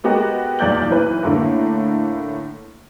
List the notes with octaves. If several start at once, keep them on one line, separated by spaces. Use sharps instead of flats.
G#3 B3 F#4 G4 A#4 D#5
B1 E2 A#2 D5 G6 F#7
B1 E3 B4
A2 D3 A3 A#3